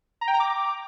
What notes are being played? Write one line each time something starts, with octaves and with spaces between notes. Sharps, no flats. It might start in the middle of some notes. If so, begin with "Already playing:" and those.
A#5
G5
A#5
D6